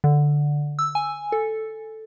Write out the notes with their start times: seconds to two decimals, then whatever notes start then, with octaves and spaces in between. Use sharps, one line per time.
0.04 D3
0.79 E6
0.95 G#5
1.32 A4